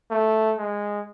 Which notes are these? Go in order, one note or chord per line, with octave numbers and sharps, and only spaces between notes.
A3
G#3